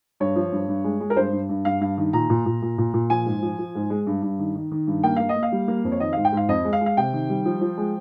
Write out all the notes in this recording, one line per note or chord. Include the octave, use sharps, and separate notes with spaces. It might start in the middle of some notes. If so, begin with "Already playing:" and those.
G2 C#5
F3
G2
G2
G#3
G#3
A#4
G2 C5
G2
G2
G2 F5
G2 F5
D#3
A#2 A#5
A#2
A#2
A#2
A#2
A#2
F3 G#5
G#2
F3
F3
G#2
G#3
G2
G2
D#3
D#3
D#3
G2
A#3 G5
A#3 F5
D#5
A#3
F5
G3
A#3
F2
C#5
D#3 D#5
G#2 F5
G5
G#2 F5
F2 D#5
G#3
F5
G#3
F5
C3 G5
D#3
G3
F3
F3
G#3